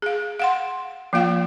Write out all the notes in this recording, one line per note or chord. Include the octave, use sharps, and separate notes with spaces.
G#4 F5
F5 F#5 C6
F3 A#3 F4 F5 G5